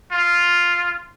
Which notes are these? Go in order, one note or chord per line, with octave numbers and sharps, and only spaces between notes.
F4